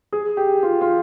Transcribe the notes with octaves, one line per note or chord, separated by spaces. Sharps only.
G#4
G4
F4
F4